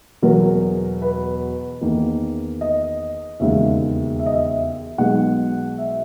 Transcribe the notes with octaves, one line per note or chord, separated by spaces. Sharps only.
E1 E2 B2 F#3 A#4
B4
E2 D#3 A#3
D#5
E1 D#2 C#3 G#3 E5
E5
D#5
E5
B1 B2 G#3 F#5
E5